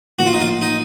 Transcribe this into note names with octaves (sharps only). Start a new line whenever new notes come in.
A1 A2 F3 A#3 F#4
F4
D#4
F4
D#4